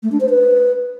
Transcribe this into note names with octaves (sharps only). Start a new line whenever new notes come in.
A3
D4
C5
B4